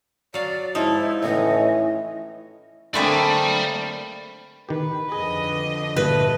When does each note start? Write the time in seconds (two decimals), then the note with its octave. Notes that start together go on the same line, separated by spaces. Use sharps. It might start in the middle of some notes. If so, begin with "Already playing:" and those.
0.34 F#3 D5 F5
0.75 G#2 F3 D#4 E4
1.22 A2 E3 C#4 C#5 D#5
2.94 D3 A3 A#3 C4 G#4 D5 B5
4.69 D#3 G4 B4
5.12 F2 D3 G#4 D#5
5.96 G1 A#2 G3 A3 B4